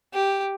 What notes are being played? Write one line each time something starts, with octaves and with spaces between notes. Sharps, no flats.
G4